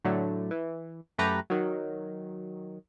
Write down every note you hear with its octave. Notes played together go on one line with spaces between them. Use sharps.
A2 D3 F#3 A3
E3
F#2 A3 G4 B4 A#5
D#3 F#3